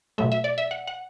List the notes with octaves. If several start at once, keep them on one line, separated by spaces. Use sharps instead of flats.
B2 F#3 A3 E5
E5
D5
E5
F#5
F#5